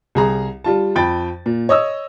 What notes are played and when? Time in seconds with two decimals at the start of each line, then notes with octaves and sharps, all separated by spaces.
0.15 C2 G#4 A#5
0.64 G3 F4 A5
0.96 F2 G5 B5 A6
1.46 A#2
1.69 C#5 D#5 D#6 E6